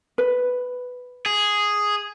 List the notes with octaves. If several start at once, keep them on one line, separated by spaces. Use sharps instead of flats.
B4
G#4